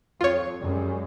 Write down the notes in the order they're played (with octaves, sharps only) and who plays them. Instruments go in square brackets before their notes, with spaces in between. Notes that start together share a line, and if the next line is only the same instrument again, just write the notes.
[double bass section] F2 [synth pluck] F4 C#5
[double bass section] F#2 G3 G#3